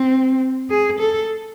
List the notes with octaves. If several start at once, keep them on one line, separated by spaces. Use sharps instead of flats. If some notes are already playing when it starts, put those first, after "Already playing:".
Already playing: C4
G#4
A4